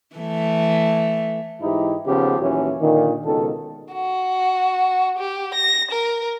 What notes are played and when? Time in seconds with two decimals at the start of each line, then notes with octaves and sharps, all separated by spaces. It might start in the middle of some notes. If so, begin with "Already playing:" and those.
0.16 E3 A3
1.61 G#2 E3 D#4 E4 G4
2.07 D#2 C#3 F3 B3 G4
2.39 D#2 A#2 E3 F#3 C#4
2.80 A#2 D3 D#3
3.25 C#2 B2 D#3 A4
3.93 F#4
5.19 G4
5.55 A#6
5.91 A#4